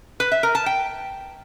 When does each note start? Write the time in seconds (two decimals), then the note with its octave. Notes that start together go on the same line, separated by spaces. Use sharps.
0.20 B4
0.32 E5
0.43 A#4
0.55 A5
0.66 G5